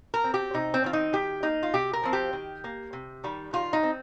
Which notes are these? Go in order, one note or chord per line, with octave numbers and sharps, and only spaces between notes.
A#4
C4
G4
C3 D#4
C4
D#3 C4 F4
D#4
D#3 G4
A#3 D#4
F4
C3 G4
A#4
F3 C4
G4
D#3
A#3
C3
D#3 G3
D#3 F4
D#4
C4